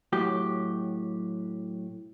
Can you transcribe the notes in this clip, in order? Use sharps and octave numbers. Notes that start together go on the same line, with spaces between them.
A2 F#3 G4